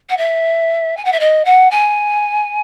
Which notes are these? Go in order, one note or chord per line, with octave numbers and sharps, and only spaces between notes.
F#5
E5
G#5
F#5
E5
D#5
F#5
G#5